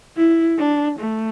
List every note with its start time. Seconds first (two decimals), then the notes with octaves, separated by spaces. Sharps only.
0.17 E4
0.58 D4
0.99 A3